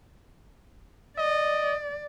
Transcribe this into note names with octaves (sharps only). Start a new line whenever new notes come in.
D5 D#5